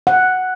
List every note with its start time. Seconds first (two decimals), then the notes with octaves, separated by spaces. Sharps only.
0.07 F#5